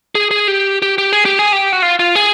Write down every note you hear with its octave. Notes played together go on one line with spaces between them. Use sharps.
G#4
G#4
G4
G4
G4
G#4
G4
G#4
G4
F#4
F4
F4
G#4